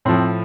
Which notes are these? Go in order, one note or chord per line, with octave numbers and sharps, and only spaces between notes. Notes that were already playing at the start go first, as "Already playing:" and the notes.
A2 F3 C4